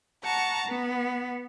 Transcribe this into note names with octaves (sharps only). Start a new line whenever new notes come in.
F#5 A5 A#5 C#6
B3